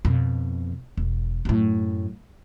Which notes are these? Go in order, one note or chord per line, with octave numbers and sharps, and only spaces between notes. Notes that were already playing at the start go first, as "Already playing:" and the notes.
F2 B2
E1
F#2 A2